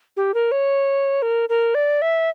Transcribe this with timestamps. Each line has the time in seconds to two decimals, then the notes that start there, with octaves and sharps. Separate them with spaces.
0.17 G4
0.34 A#4
0.52 C#5
1.22 A#4
1.49 A#4
1.75 D5
2.02 E5